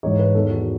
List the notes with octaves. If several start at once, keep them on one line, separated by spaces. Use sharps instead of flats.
G#2 E3 C#5
B4
E2 D#3 A4
F#4